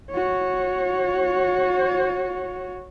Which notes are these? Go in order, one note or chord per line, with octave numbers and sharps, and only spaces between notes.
F#4 C#5